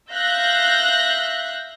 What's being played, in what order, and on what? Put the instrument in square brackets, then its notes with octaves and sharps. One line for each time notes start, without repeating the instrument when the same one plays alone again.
[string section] E5 F5 F#6 G6 A#6